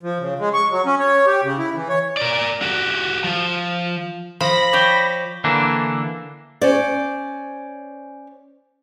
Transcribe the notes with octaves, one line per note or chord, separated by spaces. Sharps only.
F3
C#3
G#3
C#6
F#3
C#4
C#5
G4
C#3
E4
E3
C#5
A#4 D5
F#4 G4
F3
F3 B5 A#6
C#5 D5 G5 D6 G6
D3 E3 A#3 D4
C#4 C5 D5